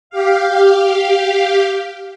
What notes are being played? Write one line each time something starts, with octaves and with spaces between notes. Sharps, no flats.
G4 F5